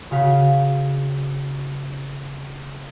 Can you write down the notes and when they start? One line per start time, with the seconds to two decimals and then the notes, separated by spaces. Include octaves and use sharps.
0.11 C#3 F#4 F5 B6